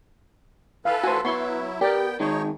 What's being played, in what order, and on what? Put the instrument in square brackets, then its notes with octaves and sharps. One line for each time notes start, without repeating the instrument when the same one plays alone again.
[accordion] E3 A4 B4 [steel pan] F5
[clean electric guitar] F#4 C5 [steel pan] G#5
[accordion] F#3 E4 [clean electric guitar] B3 [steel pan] C6 C#6
[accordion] B3 G5 [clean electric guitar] G4 [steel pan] A#4 D5
[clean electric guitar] D#3 G#3 [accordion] D#4 C#5